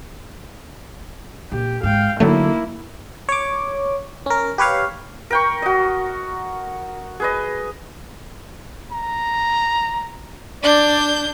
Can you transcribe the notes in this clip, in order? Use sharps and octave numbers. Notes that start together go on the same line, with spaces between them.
A#1 G4
G#2 F5 G5
D3 F#3 A3 A#3 D#4 E4
C#5 D6
C#4 A#4
G4 B4 C#5 F5
A#4 G5 C#6
F#4 D#5
G#4 B4 D#5
A#5
D4 D5 G6